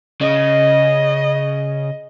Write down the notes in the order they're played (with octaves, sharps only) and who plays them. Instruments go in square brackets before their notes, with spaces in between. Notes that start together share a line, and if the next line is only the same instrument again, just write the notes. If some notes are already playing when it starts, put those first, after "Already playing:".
[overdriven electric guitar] C#3 [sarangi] D#5